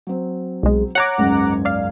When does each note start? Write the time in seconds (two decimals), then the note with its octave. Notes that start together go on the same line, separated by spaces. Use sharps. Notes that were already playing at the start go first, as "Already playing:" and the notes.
0.07 F#3 C4
0.63 B1 G#3
0.95 C#5 F#5 A#5 D6 G#6
1.18 F#1 C#2 G#2
1.65 D5 F5